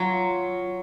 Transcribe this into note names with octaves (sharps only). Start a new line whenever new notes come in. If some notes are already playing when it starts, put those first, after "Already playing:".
Already playing: F#3 F4